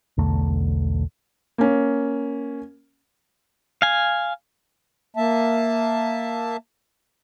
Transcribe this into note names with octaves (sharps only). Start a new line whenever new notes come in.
B1 E2 D3 A3
A#3 C#4
F5 G#5
A#3 E5 A5